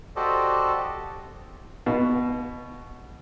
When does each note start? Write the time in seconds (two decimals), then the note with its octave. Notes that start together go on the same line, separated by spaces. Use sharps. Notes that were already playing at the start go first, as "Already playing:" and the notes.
0.16 F#4 G4 A4 C5 D5 D#5
1.86 B2